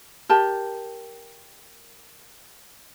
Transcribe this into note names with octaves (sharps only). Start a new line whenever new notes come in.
G4 A#4 A5